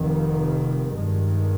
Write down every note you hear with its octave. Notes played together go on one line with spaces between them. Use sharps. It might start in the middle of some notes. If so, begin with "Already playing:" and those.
Already playing: F1 F2 C3 D#3
G2 D#3 G#3